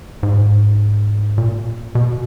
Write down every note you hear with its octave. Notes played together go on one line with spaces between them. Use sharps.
G#2
A#2
B2